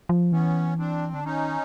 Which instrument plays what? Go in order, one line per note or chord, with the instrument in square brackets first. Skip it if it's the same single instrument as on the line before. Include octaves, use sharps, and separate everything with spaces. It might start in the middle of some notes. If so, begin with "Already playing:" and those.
[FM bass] F3
[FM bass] E3 [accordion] B3 C#4
[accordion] C4 D4
[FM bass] D3 [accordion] D4
[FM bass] D#3 [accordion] C#4 D#4